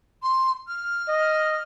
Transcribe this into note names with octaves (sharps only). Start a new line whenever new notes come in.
C6
F6
D#5